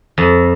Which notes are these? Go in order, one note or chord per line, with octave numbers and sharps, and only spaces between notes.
F2